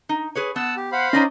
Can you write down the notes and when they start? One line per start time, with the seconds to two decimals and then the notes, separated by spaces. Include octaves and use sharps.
0.09 D#4
0.35 G#4 B4 C#5
0.56 B3 F#5 A5 E6
0.77 G4
0.92 C5 F5 F#5 B5
1.13 C#4 D#4 D5 D#5 A#6